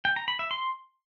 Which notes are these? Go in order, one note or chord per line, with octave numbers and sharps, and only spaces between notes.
G5
A#5
B5
E5
C6